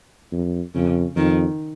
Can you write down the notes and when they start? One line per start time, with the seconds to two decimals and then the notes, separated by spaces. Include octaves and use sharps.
0.32 F2
0.75 F2 C#3
1.16 F2 D#3